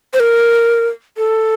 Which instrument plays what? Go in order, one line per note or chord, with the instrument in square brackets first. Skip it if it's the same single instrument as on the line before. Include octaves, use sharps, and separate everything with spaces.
[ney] C5
A#4
A4